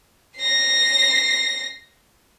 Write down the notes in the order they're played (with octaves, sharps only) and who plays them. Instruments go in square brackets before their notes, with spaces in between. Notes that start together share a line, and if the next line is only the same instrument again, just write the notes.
[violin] A#6 C7